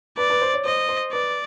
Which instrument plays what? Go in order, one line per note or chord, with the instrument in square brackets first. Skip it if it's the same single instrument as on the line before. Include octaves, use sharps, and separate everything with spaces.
[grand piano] B4 [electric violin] D5
[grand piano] B4
C5
C#5
[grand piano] C5 [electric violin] D#5
[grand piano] C5
[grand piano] B4 [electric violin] D5